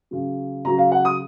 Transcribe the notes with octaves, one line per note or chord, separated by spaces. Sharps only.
C#3 F#3
C#3 F#3 A#5
F5
F#5
D#6